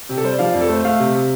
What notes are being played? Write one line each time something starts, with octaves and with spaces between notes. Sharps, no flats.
C3 G4
A4
G3 C5
D5
F3 F5
F2 D5
A4
A3 C5
A3 F5
C3
C3